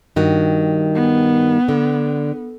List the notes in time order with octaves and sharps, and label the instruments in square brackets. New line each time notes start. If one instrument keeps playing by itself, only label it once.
[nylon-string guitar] G2 D#3 F#4
[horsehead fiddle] B3
[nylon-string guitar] D3